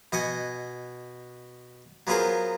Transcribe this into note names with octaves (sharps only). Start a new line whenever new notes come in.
B2 D#5 F#5 G#5
F#3 B3 F4 G#4 A#4 C5